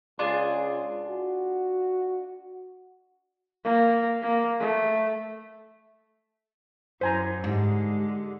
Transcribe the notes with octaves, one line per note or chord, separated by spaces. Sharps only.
C#2 D4 F4 G#4
F#4
A#3
A#3
A3
F#2 E4 C5 G#5 A#5
G#2 D3 G#3 G4